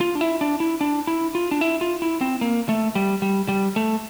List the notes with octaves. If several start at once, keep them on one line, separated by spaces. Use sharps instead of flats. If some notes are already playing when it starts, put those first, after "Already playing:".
F4
D4
E4
D4
E4
D4
E4
F4
D4
E4
F4
E4
C4
A#3
A3
G3
G3
G3
A3